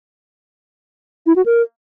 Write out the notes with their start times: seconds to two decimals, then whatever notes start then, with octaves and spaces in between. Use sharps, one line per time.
1.26 E4
1.36 F#4
1.46 A#4